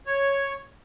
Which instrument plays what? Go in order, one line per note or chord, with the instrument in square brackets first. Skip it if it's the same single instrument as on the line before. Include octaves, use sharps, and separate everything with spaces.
[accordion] C#5